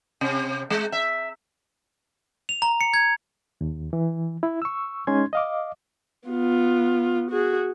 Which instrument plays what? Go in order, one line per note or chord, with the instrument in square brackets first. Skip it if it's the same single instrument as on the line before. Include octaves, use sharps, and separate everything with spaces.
[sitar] C3
G#3
E5
[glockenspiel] F7
A#5
C#7
G#6
[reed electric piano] D#2
E3
E4
C#6 E6
G#3 C#4 D#4 C6 G#6
D#5 F5 D6
[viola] B3 F4
F#4 G#4